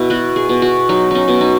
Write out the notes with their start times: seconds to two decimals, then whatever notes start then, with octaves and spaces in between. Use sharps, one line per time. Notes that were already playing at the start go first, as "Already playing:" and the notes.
Already playing: B2 E4
0.10 B3 F#4
0.36 G#4
0.49 B2
0.62 F#4
0.89 F#3 D#4
1.11 C#4 D#4
1.28 B2
1.41 D#4